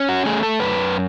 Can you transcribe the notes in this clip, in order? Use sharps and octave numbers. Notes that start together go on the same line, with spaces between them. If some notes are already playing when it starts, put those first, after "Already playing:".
Already playing: C#4
F#4
A3 G#4
A4
F#2 B4